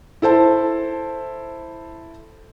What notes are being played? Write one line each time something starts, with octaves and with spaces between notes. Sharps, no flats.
E4 A4 C5 A5